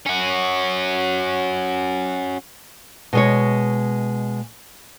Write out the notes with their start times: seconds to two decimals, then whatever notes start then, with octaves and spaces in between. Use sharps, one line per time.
0.06 C#4 F#4
3.13 B2 G#3 C#5